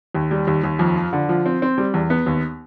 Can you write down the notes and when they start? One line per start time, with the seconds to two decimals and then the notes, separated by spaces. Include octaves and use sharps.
0.15 D#2
0.31 G3
0.47 D#2
0.64 D#2
0.79 F2
0.96 F3
1.13 D3
1.29 F3
1.46 C4
1.62 C4
1.78 G3
1.94 E2
2.10 B3
2.26 D#2